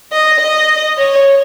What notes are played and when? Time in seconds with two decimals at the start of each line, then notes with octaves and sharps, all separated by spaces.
0.12 D#5
0.40 D#5
0.98 C#5